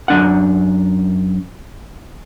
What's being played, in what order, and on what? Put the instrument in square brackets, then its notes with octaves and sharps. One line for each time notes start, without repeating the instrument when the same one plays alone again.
[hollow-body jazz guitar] F#2 D4 F#5